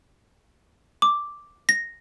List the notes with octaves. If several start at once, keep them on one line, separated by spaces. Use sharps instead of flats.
D6
A#6